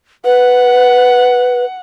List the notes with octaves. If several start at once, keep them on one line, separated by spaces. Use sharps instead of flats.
B4 F#5